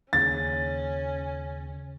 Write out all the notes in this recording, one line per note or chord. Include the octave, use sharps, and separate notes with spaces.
D#2 C#3 C#4 A6